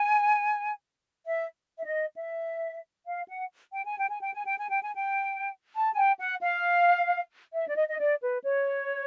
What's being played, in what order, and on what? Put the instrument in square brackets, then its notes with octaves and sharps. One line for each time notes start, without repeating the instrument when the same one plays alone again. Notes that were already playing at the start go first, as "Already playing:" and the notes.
Already playing: [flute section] G#5
E5
E5
D#5
E5
F5
F#5
G5
G#5
G5
G#5
G5
G#5
G5
G#5
G5
G#5
G5
A5
G#5
G5
F#5
F5
E5
D5
D#5
D#5
D5
B4
C#5